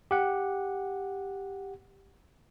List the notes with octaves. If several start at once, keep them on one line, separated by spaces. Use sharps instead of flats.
G4 F#5